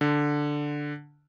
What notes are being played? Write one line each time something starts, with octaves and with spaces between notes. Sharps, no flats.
D3